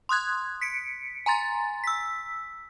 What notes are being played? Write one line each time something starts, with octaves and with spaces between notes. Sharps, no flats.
C6 D#6 F#6 G#6
B6 C#7 D7
G#5 A#5 C6 A6
E6 B6